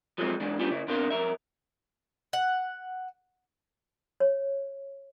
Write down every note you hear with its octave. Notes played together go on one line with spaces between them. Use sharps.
F3 F#3 G#3 B3 C4 D#4
G#2 E3 D4
G3 B3 C#4 D4 F4
C#3 E4
B2 C4 D4 A#4 F5 C6
F2 G#2 A#4 E5
F#5
C#5